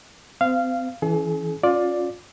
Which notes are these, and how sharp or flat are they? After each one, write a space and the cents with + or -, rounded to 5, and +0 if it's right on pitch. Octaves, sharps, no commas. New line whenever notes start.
C4 -35 F5 -15
E3 +0 C#4 +10 G#4 +45
C#4 -5 F4 +25 D5 +0